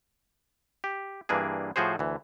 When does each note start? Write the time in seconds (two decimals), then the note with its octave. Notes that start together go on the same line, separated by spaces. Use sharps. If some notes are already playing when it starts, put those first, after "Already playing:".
0.84 G4
1.29 G2 E3 A#3 D4 G#4
1.76 A2 F3 F#4 G#4 C5
1.99 D2 E3